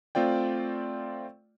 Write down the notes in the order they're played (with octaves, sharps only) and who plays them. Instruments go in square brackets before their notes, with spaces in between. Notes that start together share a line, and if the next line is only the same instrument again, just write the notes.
[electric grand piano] A3 C4 F4 D5 G5